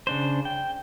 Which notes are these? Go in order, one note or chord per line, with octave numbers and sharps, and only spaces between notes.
C#3 D4 C5
G5